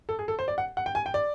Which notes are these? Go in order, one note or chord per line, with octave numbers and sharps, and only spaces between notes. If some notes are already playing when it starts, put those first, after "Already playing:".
A4
G#4
A4
C5
D5
F#5
F#5
G5
G#5
G5
D5